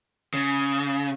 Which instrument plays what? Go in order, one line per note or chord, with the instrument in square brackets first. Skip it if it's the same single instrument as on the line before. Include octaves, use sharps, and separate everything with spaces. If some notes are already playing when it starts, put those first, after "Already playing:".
[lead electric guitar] C#3